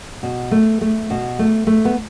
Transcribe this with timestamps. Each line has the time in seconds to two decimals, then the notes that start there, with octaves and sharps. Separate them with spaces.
0.23 B2
0.51 A3
0.81 A3
1.10 B2
1.39 A3
1.67 A3
1.85 B3